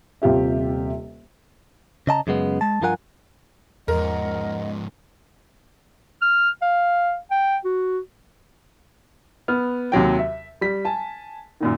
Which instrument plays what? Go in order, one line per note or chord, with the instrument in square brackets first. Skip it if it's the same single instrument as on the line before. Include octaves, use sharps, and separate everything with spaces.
[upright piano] D#1 C3 F4 G4 E5
[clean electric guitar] C#3 D#5 A5 A#5
F#2 C#3 G#3 B3
G#3 A5
G2 F3 F4 A#4 F#5 G#5
[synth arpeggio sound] E2 [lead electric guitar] G#2 F3 [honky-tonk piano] A#4 [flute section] D#5 F#5
[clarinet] F6
F5
G5
F#4
[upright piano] B3 F6
D#2 C3 F#3 G5
E5
G3 B6
G#5 A5
F#2 A#2 D#3